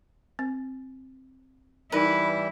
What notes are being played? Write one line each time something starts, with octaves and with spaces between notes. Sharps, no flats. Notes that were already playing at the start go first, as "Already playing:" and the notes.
C4
E3 G3 D#4 E4 A#4 B4